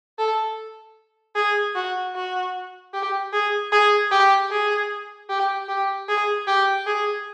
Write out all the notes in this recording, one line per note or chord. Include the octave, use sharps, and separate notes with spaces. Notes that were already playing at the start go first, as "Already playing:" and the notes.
A4
G#4
F#4
F#4
G4
G#4
G#4
G4
G#4
G4
G4
G#4
G4
G#4